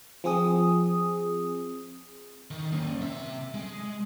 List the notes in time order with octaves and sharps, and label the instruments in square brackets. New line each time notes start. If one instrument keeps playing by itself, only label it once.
[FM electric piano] F3 C4 G#4 D#6
[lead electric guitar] D#3
A#3 C#4
C3 E5
G#3